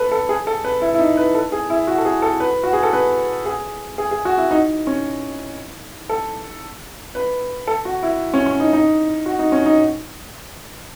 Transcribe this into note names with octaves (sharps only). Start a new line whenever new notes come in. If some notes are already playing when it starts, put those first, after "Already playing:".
Already playing: A4 B4
A4
G#4
A4
B4
E4
E4
D#4
B4
A4
G#4
E4
F#4
A4
G#4
A4
B4
F#4
G#4
A4
B4
G#4
G#4
G#4
F#4
E4
D#4
C#4
A4
B4
A4
F#4
E4
C#4
C#4
D#4
D#4
F#4
D#4
C#4
D#4